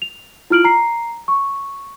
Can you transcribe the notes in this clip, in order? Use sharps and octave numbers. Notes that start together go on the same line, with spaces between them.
F7
E4 F4 F6 D7 F#7
A#5 C7
C#6